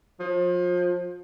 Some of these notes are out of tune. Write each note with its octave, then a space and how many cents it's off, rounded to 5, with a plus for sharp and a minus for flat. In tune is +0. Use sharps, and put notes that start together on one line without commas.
F3 +30